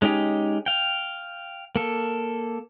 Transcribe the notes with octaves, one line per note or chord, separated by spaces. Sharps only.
G#3 C#4 D#4 G4
F5 G5
A#3 A4